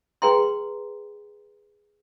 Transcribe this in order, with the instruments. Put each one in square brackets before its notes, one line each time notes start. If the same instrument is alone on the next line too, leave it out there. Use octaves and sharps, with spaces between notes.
[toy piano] G#4 B4 G5 A#5 C6